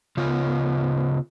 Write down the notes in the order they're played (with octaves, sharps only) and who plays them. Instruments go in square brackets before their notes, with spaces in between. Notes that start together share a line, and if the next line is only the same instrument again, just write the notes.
[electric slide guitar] C#3 B3 F4